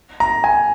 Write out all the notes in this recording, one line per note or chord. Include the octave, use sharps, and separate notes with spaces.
A#5
G#5